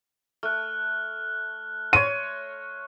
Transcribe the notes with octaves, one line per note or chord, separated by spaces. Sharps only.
A3 F6 F#6
C#5 C6 D#7